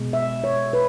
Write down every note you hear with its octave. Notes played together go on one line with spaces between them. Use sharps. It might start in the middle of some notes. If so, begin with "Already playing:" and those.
Already playing: B2 G#3
E5
C#5
B4